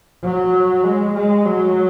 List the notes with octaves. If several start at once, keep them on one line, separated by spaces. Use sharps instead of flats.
F#3
G#3
G#3
F#3